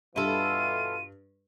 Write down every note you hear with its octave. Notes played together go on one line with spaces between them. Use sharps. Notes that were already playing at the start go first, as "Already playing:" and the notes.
G2 B2 E3 E4 F4 A4 D#7